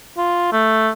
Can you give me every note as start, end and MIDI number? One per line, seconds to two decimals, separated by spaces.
0.17 0.49 65
0.52 0.90 57